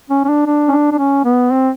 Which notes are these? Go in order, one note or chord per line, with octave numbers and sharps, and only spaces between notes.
C#4
C#4
D4
D4
C#4
D4
D4
C#4
B3
C4